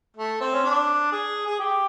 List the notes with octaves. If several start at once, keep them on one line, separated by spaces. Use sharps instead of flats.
A3
C4
C#4
D4
G#4
G#4
G4